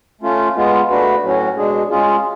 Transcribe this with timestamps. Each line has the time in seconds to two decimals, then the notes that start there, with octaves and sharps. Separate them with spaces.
0.21 A3 C#4 F4
0.55 G#3 B3 F4
0.89 A3 D4 F#4 B4
1.22 A2 F#3 C#4 F#4
1.56 B2 G#3 D4 G#4
1.89 G#3 C#4 F4 G#4